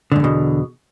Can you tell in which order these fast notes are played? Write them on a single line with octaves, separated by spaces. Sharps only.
D3 G#2 E2 B2